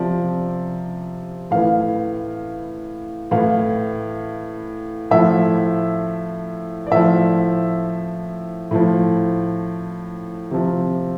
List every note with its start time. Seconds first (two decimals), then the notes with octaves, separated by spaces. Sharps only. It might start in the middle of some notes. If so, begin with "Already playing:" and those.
Already playing: C3 F3 D5
1.51 A2 E3 F5
3.31 A2 E3 F5
5.11 A2 F3 E5
6.87 D5
6.91 A2 F3 E5
8.71 A2 F3
10.51 C3 F3